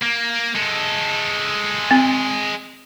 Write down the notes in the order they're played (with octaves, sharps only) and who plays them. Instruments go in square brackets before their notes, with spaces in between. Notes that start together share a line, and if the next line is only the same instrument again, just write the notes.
[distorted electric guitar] A#3
G#3 A4
[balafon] C4